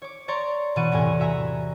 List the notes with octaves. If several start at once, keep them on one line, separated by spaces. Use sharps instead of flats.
C#5 D6
C#5 D5 A#5 C6 C#6
B2 E3 D5 F#5 C#6 D#7
E2 A2 C3 G#5
F#4 E5 G#5 A#5